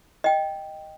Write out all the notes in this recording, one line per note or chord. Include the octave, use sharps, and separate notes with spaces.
D#5 G5